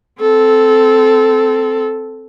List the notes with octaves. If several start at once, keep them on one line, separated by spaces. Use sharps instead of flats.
C4 A4